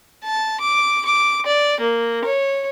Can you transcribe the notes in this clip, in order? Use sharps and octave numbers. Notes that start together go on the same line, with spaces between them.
A5
D6
D6
D5
A#3
C#5